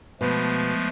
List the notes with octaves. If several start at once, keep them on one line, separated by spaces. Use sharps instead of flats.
B2 F3 G#3 A3